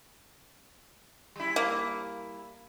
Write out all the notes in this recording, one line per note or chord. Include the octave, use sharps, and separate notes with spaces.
G3 E4
A#3